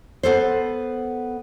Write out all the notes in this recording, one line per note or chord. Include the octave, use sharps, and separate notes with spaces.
B3 A4 C5